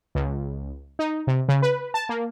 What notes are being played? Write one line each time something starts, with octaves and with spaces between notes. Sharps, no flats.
C#2
D#4
C3
C#3
B4
A5
A#3